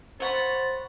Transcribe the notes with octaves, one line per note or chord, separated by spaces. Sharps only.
C5 C#5 F#5 B5 A6